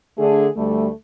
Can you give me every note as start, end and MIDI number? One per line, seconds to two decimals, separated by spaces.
0.18 0.47 50
0.18 0.47 57
0.18 0.47 62
0.18 0.47 68
0.56 0.88 38
0.56 0.88 55
0.56 0.88 57